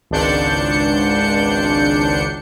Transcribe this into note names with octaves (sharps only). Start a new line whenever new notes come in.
G#1 C#2 D4 G6 C#7